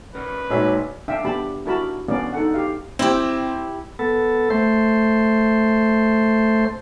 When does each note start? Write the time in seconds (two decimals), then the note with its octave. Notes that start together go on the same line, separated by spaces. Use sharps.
0.15 C#4 A#4 B4 D5
0.50 A#1 F#3 G#3 D#4 C5 E6 B6
1.08 D4 E5 F5 G5
1.25 B3 D4 G4 A5 B5
1.66 D4 E4 F#4 A#4 A5 B5
2.08 B3 C#4 D4 A#4 D5 F5
2.33 D#4 A4 F#5
2.54 G4 F5
2.99 C4 E4 G4
3.99 B3 A4
4.50 A3 C5